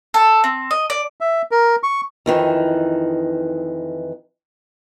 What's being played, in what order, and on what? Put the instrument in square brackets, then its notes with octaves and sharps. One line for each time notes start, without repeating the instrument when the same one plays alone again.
[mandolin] A4
C4
D#5
D5
[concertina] E5
A#4
C#6
[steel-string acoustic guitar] F2 D#3 E3